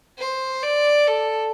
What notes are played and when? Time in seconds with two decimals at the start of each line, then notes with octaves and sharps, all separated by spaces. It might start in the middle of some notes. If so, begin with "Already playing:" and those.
0.18 C5
0.63 D5
1.08 A4